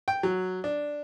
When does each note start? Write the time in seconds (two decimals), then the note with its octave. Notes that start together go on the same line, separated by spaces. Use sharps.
0.08 G5
0.23 F#3
0.64 D4